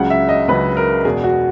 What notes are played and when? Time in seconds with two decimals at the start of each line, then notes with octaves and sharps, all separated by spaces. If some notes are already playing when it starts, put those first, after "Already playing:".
Already playing: C#2 C#3 F#3 F#5
0.10 E5
0.29 D#5
0.48 C#2 C#3 F#3 B4
0.77 A#4
1.05 E2 B2 G#3 G#4
1.24 F#4